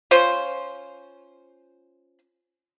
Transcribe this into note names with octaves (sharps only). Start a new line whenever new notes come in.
C#4 F4 C5